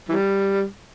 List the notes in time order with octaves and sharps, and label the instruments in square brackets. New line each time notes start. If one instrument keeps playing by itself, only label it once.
[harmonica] E3 G3